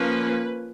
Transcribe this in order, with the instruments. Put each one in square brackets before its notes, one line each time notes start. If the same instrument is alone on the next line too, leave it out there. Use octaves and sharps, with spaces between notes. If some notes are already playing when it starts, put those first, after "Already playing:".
Already playing: [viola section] F3 A#3 C#4 B4